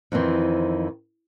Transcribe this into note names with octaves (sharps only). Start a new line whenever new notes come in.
F2 D#3 E3 C4